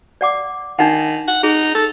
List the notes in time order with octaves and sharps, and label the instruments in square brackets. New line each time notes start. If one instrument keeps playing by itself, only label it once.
[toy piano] D5 F#5 D6
[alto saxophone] D#3 [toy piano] D4 D#4 F#5
[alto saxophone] F#5
[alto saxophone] D#4 [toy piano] G#4
[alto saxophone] A4